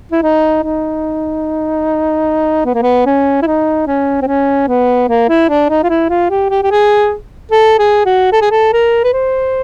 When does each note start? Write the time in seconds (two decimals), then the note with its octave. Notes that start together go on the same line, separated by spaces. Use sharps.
0.12 E4
0.23 D#4
0.63 D#4
2.65 B3
2.74 A#3
2.82 B3
3.06 C#4
3.42 E4
3.47 D#4
3.87 C#4
4.22 C4
4.27 C#4
4.68 B3
5.09 A#3
5.29 E4
5.49 D4
5.69 D#4
5.83 F4
5.89 E4
6.10 F4
6.30 G4
6.50 G4
6.63 G4
6.71 G#4
7.52 A4
7.79 G#4
8.06 F#4
8.33 A4
8.42 G#4
8.51 A4
8.73 A#4
9.04 B4
9.13 C5